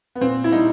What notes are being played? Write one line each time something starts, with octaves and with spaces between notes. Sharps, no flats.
B3
A#2 C4
E4
G3 D#4